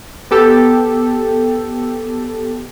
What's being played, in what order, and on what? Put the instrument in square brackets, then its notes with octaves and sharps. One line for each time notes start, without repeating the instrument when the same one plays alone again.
[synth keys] B3 G4 A4